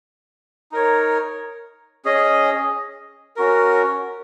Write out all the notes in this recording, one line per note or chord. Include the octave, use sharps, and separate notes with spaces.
D#4 A#4 C#5
C#4 G#4 D#5
C#4 F#4 A#4